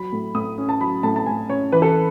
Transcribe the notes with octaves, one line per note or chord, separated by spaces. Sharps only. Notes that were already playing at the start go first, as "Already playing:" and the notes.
Already playing: F#3 B5
A2
A2 D#6
C#4
A5
F#3 B5
A2 A5
A5
A2 G#5
C#4 C#5
E3 B4
A4